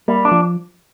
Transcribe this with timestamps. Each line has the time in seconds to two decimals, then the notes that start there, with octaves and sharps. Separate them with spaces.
0.08 G3 A#3
0.25 D4
0.32 F3